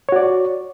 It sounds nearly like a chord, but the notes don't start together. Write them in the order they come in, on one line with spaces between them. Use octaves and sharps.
C#5 F#4 D5